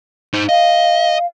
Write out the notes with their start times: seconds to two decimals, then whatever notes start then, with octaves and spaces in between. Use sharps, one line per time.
0.34 D#4 C5
0.49 D#5 F5